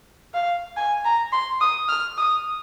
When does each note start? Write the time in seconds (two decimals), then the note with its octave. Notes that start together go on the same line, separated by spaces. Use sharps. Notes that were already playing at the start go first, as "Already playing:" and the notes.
0.34 F5
0.77 G#5
1.05 A#5
1.32 C6
1.61 D#6
1.89 F6
2.18 D#6